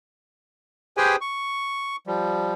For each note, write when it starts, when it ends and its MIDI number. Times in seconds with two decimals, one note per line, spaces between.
0.97 1.16 67
0.97 1.16 68
0.97 1.16 71
0.97 1.16 72
0.97 1.16 79
0.97 1.16 80
1.21 1.96 85
2.07 2.54 53
2.07 2.54 55